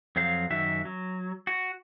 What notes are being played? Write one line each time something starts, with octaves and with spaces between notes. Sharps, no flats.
F2 F#3 C5 F5
F#2 D#3 F#4 E5
F#3
F#4